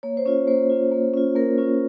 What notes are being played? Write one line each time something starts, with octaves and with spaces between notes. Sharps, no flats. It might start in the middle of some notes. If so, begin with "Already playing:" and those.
A#3 C#5
C5
C#4 F4 C#5
A#3 C5
C#4 F4
A#3
C#4 F4
A#3 A#4
C#4 F4